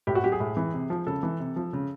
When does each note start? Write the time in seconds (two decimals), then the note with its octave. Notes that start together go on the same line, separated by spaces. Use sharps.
0.07 A2 G4
0.15 F#4
0.24 F#3 G4
0.32 G#4
0.40 A2
0.57 E3
0.74 C3
0.90 F3
1.07 C#3 A4
1.23 E3
1.40 C3
1.56 F3
1.73 C#3